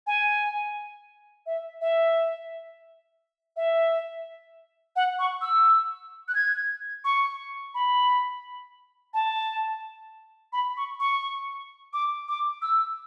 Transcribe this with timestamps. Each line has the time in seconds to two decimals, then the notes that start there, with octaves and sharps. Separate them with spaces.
0.07 G#5
1.46 E5
1.81 E5
3.56 E5
4.96 F#5
5.19 C#6
5.41 E6
6.28 F#6
6.35 G#6
7.05 C#6
7.75 B5
9.14 A5
10.53 B5
10.77 C#6
11.00 C#6
11.93 D6
12.28 D6
12.62 E6